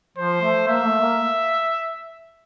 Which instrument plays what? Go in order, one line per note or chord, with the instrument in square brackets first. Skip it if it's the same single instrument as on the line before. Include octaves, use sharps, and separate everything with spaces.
[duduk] F3 [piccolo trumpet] C5
[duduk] A3
[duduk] A#3 [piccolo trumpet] E5
[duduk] A3
A#3